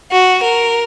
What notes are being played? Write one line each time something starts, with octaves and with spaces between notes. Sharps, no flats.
F#4
A#4